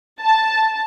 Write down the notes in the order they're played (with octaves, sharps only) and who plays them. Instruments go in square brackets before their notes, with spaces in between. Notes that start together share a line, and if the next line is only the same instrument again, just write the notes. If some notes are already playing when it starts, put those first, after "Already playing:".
[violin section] A5